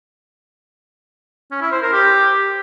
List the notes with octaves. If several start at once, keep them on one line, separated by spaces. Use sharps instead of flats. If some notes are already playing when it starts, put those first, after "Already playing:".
C#4
E4
C5
A#4
G4